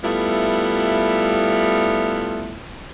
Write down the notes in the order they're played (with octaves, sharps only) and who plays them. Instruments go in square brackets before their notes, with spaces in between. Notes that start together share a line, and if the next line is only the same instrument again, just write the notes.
[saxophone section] G3 A3 B3 E4 F4